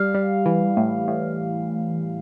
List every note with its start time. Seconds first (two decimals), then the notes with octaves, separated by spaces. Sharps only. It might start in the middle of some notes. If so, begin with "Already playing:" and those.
Already playing: G3 F5
0.14 G3
0.45 E3
0.77 A2
1.08 A2